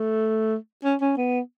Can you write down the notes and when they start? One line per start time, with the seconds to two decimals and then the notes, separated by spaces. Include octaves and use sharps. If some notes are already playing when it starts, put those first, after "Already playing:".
Already playing: A3
0.84 C#4
1.01 C#4
1.17 B3